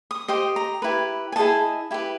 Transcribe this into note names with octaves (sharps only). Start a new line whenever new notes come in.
D#6
G4 C5 D#5 D#6
A#5
E4 G4 B4
G#5
E4 G#4 C5 D#5 A5
E4 G4 B4